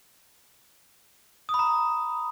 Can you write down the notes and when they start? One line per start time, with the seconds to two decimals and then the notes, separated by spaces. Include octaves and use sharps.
1.49 D#6
1.54 B5
1.59 A#5